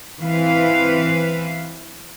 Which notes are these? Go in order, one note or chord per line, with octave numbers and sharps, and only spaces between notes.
E3 C4 B4 F5